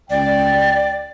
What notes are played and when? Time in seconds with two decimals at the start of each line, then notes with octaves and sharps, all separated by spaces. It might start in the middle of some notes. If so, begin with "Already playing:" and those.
0.10 C#2 D5 G5